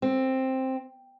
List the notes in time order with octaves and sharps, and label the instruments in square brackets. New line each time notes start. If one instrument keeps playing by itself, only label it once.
[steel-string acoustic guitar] C4